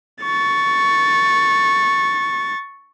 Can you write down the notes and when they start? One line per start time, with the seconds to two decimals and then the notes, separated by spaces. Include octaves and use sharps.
0.23 C#6 A6